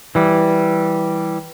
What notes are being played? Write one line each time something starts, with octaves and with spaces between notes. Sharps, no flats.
E3 G3